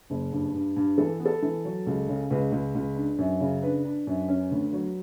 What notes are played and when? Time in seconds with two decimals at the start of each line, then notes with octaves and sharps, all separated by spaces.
0.10 F#1
0.32 G2
0.54 G2
0.76 G2
0.98 E3 A4
1.20 B3
1.25 A4
1.42 E3
1.65 F#3
1.86 C#2
2.08 C#3
2.30 C#2 B4
2.52 C#2
2.75 C#2
2.96 D4
3.18 F#2
3.40 C#3
3.62 D4 B4
3.85 D4
4.07 F#2
4.29 C#4
4.51 D2
4.73 F#3